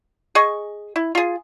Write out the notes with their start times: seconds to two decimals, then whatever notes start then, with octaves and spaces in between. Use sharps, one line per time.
0.35 G#4 D#5 C#6
0.96 E4
1.15 F4 G#4